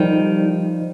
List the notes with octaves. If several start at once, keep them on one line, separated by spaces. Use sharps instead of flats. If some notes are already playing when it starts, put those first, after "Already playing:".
Already playing: D#3 F3 G3